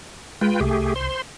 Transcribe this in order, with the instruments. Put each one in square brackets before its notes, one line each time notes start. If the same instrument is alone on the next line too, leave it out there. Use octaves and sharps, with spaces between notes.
[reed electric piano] G#3 [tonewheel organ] F4 B4 G5
[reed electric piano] C2 [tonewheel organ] A3 G4 G#4
[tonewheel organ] C5 C6